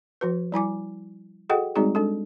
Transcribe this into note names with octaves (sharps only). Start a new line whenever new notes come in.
F3 F#4 B4
G3 E4 G#5 D6
F#4 G#4 A4 D#5 F#5 G5
G3 G#3 C4 D#4 F#4 G#4
G#3 D4 A4